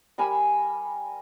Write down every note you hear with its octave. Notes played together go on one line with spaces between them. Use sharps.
G3 A#4 G#5 B5